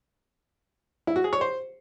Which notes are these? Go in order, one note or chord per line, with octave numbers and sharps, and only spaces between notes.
E4
F#4
G#4
C#5
C5